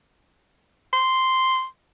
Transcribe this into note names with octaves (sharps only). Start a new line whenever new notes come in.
C6